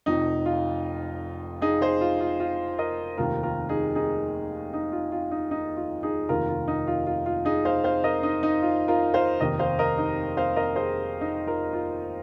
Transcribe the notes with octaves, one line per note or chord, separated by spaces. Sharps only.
F1 F2 F3 D#4
F4
D#4 G#4
G#4 C5
F4
F4
F4
A#4 D#5
F1 D#2 D#3 F4 A#4
F4 A#4
D#4 G#4
D#4 G#4
D#4
F4
F4
D#4
D#4
F4
D#4 G#4
F1 D#2 D#3 F4 A#4
F4
D#4
F4
F4
F4
D#4 G#4
C5 F5
C5 F5
A#4 D#5
D#4
D#4
F4
F4 A#4
C5 F5
F1 D#2 D#3 A#4 D#5
C5 F5
A#4 D#5
D#4
C5 F5
A#4 D#5
G#4 C5
D#4
F4 A#4
F4